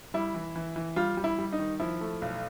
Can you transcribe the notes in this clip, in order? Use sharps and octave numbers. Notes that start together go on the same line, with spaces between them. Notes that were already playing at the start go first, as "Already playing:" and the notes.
G3 E4
E3
E3
E3
G3 F4
G3
E4
G3
D#4
D#3
F3 E4
A3
B1